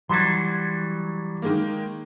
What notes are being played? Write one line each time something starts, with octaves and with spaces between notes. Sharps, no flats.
E3 F#3 G3 C6 G#6
D#3 G#3 A#3